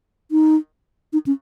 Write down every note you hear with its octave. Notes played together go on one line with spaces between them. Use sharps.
D#4
D#4
C#4